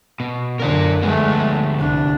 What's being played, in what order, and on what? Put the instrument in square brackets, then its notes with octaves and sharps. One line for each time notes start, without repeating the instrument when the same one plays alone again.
[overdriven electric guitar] B2
[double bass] F#2 D3 [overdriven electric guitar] A#4 D5
[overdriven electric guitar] D2 B3 [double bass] G#3 A3
[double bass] C2 D4